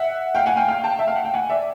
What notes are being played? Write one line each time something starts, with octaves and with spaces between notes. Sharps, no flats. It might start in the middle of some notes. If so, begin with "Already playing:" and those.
Already playing: E5 F#5
F5 G5
F#5 G#5
F5 G5
F5 G5
G5 A5
E5
F5
F#5
G5
F#5 G#5
D5 E5